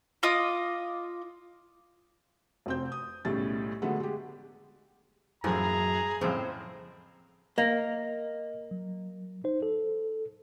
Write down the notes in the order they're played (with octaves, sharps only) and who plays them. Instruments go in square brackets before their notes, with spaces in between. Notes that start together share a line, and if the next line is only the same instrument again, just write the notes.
[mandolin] F4 D#5 D6 D#6
[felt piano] F1 C4 G6
D#6
B1 A2 C#3 G3 A6
D3 F#3 G#3 A3 B3
G#3 G4
[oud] F#2 A#3 [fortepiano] A2 E3 F3 [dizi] G#4 [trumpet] A#5
[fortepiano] F2 A2 C#3 [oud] C4
[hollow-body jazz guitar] A#3 [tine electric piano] D#5
[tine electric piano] F#3
D#4 C5
A4